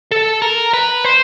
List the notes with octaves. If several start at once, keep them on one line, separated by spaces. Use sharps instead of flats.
A4
A#4
B4
C5